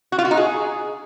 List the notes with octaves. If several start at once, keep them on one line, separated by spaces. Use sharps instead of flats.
F#4
F4
F#4
D#4
G#4